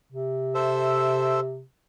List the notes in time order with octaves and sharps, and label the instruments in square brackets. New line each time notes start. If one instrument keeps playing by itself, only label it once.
[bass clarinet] C3
[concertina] A4 C5 E5